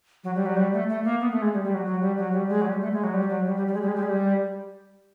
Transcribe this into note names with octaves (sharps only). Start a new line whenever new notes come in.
F#3
G3
F#3
G3
A3
A3
A#3
B3
A3
G#3
G3
G3
F#3
F#3
G3
F#3
G3
G#3
F#3
G3
A3
G#3
F#3
G3
F#3
G3
G3
G3
G#3
G3
G#3
G3
G#3
G3